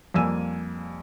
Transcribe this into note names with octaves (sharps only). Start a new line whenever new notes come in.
F2 G3 A#3 G#5 E6 D#7